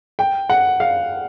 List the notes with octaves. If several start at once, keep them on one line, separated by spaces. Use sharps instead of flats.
G5
F#5
F5